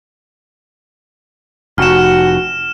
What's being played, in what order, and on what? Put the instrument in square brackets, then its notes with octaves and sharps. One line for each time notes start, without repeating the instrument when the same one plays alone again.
[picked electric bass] F1 [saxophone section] F#4 [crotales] F6 E7